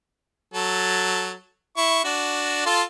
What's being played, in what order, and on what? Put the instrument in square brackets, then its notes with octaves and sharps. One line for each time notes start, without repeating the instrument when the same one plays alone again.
[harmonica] F#3 A4
E4 C#6
D4 F#4
F4 A4 C6